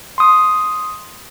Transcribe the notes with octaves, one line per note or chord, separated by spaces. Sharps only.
C6 D#6